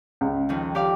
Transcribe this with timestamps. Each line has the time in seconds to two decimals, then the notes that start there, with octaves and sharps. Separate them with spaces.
0.21 C#2
0.49 F2 D#3
0.75 G4 D5 F5